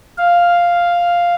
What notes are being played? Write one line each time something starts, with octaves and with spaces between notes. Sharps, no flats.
F5